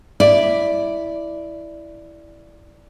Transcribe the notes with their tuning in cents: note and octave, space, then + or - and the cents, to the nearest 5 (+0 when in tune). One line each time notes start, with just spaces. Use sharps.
E4 +0 D5 +0